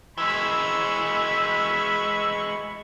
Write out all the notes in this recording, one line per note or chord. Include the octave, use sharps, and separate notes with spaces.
E3 G#3 B5 C#6 E6